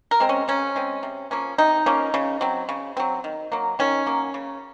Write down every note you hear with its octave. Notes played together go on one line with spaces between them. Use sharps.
A#4
G#3 C4
C#4
C#3 C#4
G#3 C4
C3
F3 A#3 C#4
C3 D#4
F3 A#3 C#4
C#3
F#3 C4
C#3
F#3 C4
D#3
F#3 A#3
D#3 C#4
F#3 A#3
C#3